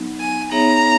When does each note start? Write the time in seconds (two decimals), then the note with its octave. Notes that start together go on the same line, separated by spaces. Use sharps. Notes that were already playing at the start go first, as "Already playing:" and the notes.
Already playing: F#3 B3 D#4
0.20 G#5
0.52 B3 D#4 G#4 C#5 E5 A#5